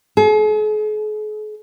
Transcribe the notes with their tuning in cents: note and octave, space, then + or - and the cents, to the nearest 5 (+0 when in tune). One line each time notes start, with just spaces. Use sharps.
G#4 +45